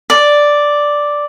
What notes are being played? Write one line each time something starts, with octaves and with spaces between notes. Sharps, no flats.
D5